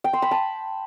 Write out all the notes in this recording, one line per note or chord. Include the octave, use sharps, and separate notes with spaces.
G5
C6
B5
A5